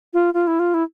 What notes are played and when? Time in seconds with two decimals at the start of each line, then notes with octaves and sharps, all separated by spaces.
0.14 F4
0.34 F4
0.47 E4
0.59 F4
0.74 E4